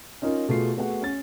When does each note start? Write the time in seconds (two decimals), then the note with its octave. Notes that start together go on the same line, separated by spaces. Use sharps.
0.22 C#4 D#4 F4 A#4
0.49 B2 A3 F4 G#4 C7
0.77 A3 B3 F#4 G#4 F#5
1.02 C#4 A6